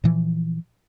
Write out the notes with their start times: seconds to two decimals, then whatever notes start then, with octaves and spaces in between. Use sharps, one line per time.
0.04 A#2 E3 F3